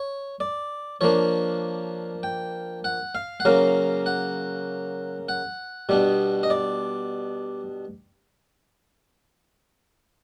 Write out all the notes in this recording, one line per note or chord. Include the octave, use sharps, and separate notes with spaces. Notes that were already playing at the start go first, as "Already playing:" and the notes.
Already playing: C#5
D5
F3 A#3 D4 C#5
G5
F#5
F5
F#5
C#3 F#3 A#3 F5
F#5
F#5
B2 G3 B3 D4
D#5
D5